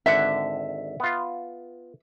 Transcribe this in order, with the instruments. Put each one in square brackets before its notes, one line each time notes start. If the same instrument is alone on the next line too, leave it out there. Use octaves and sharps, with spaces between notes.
[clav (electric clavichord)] G#1 D3 F#5 [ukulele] E5
[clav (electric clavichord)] B3 F4